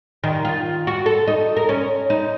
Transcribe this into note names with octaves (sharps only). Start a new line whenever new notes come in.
D#3
F4
F#4
A4
D#4
A#4
C#4
D#4